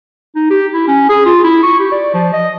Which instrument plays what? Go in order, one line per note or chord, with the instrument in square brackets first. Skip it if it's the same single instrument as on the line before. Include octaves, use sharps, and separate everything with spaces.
[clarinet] D#4
G4
E4
C#4
G#4
F4
E4
C#6
G4
D5
F3
D#5